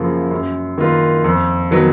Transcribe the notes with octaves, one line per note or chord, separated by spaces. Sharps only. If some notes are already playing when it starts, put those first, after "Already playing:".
Already playing: F#2 C#3 F3 A#3
F#2
D#3 A#3 F4 B4
F2
D#3 F#3 B3